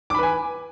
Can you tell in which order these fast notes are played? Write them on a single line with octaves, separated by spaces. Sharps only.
D6 B5 B4 G#5